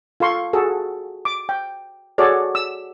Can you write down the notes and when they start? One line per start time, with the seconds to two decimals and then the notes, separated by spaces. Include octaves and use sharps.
0.20 F4 A4 F5 C6 C#6
0.53 F#4 G#4 A4
1.25 D6
1.49 G5
2.18 F#4 G#4 A4 C#5 D5
2.55 E6